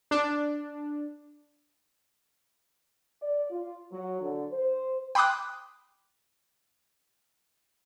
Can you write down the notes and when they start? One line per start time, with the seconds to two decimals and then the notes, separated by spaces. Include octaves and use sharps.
0.11 D4
3.21 D5
3.50 F4
3.92 F#3
4.20 D3
4.51 C5
5.15 G5 B5 C6 D6 D#6 F#6